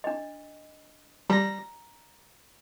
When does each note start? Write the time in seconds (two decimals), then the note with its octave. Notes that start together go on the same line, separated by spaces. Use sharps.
0.04 D4 D#5
1.30 G3 A#5 A#6